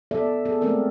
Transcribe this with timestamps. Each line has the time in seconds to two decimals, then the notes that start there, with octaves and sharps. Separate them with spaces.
0.11 B3 A4 D5 E5
0.45 B3 G#4 A4
0.61 G#3 A3 C4 A4 A#4 D5